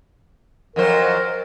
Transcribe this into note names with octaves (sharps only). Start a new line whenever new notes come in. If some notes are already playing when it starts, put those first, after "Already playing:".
F2 F#3 A#4 C5